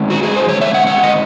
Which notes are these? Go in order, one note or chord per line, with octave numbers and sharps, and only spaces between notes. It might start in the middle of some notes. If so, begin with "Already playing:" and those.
Already playing: D#3 G#3 C#4
F#4
G#4
C5
C#5
E5
F#5
F#5
D#5